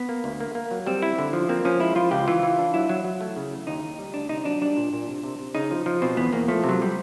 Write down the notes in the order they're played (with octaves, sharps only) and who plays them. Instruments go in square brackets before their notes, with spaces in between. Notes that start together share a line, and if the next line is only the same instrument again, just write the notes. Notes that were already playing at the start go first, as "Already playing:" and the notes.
Already playing: [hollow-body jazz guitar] B3
[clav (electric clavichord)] A#3
D2
A#3
A#3
F#3
[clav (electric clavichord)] G3 [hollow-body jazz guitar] C4
[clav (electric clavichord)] E4
D3
F3
[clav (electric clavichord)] A#3 [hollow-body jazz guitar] C4
[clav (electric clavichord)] F3 [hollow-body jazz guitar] C#4
[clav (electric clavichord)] G#3 [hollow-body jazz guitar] E4
[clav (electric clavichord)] F3 [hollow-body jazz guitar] F4
[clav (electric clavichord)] C#2 [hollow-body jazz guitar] G4
[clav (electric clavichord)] E3 [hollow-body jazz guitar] F4
[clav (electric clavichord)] E3
D4
[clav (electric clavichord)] F#3 [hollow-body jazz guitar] E4
[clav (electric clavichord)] F#3
F#3
A3
C#3
A3
[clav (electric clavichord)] D#2 [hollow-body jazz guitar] D#4
[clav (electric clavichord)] D#2
G3
[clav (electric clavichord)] D2 [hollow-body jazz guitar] D4
[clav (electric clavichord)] C3 [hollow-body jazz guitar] D#4
[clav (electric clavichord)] F#3 [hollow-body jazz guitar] D4
[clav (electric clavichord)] G3 [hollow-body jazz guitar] D4
[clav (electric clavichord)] A#2
A#2
C3
C3
C3
[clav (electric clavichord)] C#3 [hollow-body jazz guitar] D#4
[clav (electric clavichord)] F3
F3
[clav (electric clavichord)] B2 [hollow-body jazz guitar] C4
[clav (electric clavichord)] E2 [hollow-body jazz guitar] B3
[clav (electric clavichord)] E2 [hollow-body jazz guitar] A#3
[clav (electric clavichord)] F3 [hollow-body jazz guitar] A3
[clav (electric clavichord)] C3 [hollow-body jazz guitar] F#3
[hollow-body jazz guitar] G3